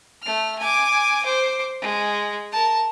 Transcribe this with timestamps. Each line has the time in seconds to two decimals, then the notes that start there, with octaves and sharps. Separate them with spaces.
0.22 A3 F6
0.59 G#5 D6
1.23 C5 D6
1.81 G#3
2.52 A#4 A5